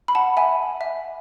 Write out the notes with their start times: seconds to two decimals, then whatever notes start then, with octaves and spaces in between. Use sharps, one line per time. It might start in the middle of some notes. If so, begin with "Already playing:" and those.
0.08 B5
0.15 F#5 A5
0.37 E5 G#5
0.81 E5